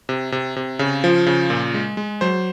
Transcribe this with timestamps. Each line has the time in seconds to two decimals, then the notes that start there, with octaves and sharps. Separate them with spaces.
0.09 C3
0.32 C3
0.56 C3
0.79 C#3
1.04 F3
1.27 C#3
1.50 A#2
1.74 G#3
1.97 G#3
2.21 F#3 C5